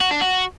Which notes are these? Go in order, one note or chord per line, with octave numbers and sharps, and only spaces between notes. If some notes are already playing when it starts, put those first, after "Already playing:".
F#4
D4
F#4